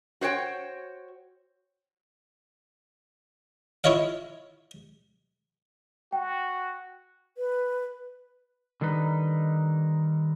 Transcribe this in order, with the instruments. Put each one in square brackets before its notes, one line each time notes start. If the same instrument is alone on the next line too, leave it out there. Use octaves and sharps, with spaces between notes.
[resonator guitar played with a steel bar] F#4 C5 C#5 G5
[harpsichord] E4 F4 C#5 D#5 F5
[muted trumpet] F#4 [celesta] G5
[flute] B4
[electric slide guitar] D3 D#3 G3 D#4 B4